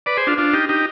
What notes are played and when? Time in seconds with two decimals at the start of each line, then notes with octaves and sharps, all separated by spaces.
0.06 B4 D5
0.17 G#4 C5
0.27 D4 F4
0.38 D4 F4
0.53 D#4 G4
0.69 D#4 G4